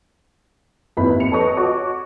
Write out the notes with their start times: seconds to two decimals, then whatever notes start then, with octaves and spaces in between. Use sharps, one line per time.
0.97 G#1 D#2 E4 B4 B5
1.20 F1 F2 C#7 F7
1.32 A4 B4 C#5 D#5 C#6
1.57 F#4 C#5 C#6 D6